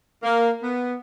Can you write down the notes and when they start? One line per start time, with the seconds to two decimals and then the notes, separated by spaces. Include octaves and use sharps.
0.23 A#3
0.62 B3